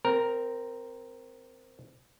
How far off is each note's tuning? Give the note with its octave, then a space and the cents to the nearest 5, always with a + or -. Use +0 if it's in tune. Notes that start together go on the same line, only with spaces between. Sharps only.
C4 -10 A#4 +0